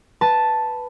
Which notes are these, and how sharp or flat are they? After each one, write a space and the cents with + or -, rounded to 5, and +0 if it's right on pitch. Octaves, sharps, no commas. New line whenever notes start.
B4 +0 A5 +0